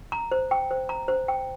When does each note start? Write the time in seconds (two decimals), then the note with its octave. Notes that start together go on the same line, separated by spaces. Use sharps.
0.12 A#5
0.31 C5
0.51 G5
0.71 C5
0.89 A#5
1.08 C5
1.28 G5